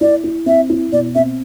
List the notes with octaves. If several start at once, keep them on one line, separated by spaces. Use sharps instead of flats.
E4 D5
E4
C4 E5
E4
B2 D5
C4 E5